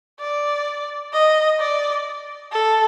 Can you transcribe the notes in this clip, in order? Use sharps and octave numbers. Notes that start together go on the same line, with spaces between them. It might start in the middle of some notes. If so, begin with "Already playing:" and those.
D5
D#5
D5
A4